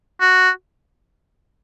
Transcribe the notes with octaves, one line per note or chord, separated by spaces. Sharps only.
F#4